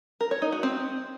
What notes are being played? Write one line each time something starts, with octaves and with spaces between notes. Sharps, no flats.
A#4
C#5
D#4
F#4
C4